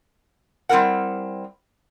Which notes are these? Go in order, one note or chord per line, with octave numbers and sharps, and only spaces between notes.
G3 C4 D4 E4 A#4 F#5